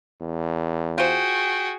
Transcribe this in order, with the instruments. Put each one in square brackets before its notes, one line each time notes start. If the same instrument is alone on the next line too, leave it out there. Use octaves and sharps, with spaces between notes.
[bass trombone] E2
[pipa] F4 C5 [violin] F#4 G#4 [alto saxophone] G5